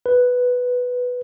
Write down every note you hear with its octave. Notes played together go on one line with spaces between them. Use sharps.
B4